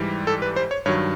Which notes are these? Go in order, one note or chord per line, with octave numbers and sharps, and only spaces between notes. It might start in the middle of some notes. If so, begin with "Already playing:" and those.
Already playing: G#2 E3 G3
A4
B4
C5
C#5
G2 D#3 F#3 C#5